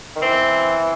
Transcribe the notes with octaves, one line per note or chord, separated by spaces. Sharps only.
D#3
E3 C4